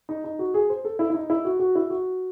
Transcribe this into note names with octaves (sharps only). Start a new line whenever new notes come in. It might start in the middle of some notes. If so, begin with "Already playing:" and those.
D#4
D#4
F#4
G#4
C5
A4
E4
E4
D#4
E4
F#4
F#4
E4
F#4